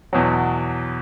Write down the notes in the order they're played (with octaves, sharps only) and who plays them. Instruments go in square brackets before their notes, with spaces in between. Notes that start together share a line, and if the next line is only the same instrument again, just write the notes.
[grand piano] E2 B2 F#3